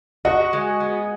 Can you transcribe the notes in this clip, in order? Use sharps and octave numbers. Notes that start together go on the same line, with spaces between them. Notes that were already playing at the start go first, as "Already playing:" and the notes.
F#4 D#5 F#5
G#3
B3